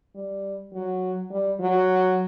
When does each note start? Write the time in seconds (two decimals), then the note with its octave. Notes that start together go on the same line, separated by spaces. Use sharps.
0.15 G3
0.73 F#3
1.31 G3
1.60 F#3